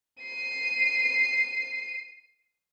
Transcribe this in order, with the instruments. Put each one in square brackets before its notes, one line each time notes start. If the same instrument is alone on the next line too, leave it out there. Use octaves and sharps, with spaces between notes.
[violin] C7 D#7